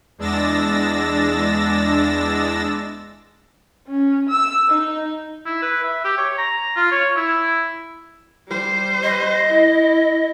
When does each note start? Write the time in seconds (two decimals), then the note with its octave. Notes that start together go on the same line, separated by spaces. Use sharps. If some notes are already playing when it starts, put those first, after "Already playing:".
0.18 E2 G#3 D4 E6 A6 A#6
3.87 C#4
4.28 E6
4.70 D#4
5.45 E4
5.62 B4
5.83 E5
6.04 G4
6.18 C#5
6.38 A#5
6.76 F4
6.91 C#5
7.16 E4
8.48 G3 C5
9.03 D#5
9.49 E4